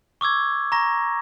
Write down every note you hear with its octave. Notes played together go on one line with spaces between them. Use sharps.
C#6 D6 E6 G#6
A#5 C#6 A#6